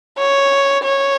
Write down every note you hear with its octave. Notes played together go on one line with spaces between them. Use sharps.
C#5
C#5